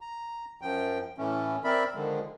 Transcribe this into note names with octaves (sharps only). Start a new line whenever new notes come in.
A#5
F#2 F3 G5
A2 E3 A3 C#4
C4 A#4 D5 E5 B5
D3 D#3 F3 G#3